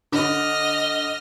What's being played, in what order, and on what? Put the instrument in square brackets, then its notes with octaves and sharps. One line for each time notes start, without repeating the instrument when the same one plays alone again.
[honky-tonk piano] D3 [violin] D#5 F6